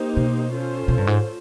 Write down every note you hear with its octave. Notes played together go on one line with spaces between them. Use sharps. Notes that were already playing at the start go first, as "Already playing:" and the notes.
Already playing: A#3 D#4 G4 C5
B2
C#4 F4 A4 C5
B2
G2
G#2